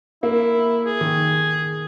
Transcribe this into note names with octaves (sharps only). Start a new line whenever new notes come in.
A#3 E4
G#4
D#3